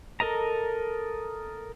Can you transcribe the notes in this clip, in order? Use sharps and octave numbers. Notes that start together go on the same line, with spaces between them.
A4 A#4 D#5 A#5